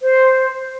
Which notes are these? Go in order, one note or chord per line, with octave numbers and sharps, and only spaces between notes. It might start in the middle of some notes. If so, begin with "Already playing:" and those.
C5